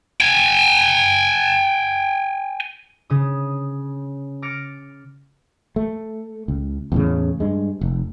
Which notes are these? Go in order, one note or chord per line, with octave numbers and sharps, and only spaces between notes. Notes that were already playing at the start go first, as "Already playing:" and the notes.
G5 G#5
C#3 D#6
D6 F6 A6 A#6 C#7 D7
A3
C#2
E2 A2 C#3
G2 G#3
F1